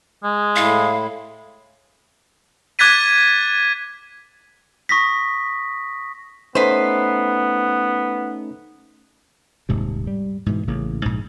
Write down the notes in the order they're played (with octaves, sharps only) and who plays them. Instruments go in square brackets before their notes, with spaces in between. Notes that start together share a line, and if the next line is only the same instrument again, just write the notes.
[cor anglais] G#3
[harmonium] A2 E4 [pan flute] F5
[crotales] D6 F#6 G#6 A6 B6 D#7
[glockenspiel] C#6 D#6 A#6 B6
[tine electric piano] A3 C#4 D#4 [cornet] B3 [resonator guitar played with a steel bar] B4 C5
[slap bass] D#1 G#2 C3
G3
G#2 B2 E3
A1 C#3 A#3
A#1 G#2